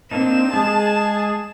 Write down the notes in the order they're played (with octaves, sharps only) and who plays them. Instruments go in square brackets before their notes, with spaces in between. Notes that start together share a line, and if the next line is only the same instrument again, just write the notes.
[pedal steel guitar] A#3 D4 D#4 [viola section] C4 [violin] E7
[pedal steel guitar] G#3 [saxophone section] G#4 [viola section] A5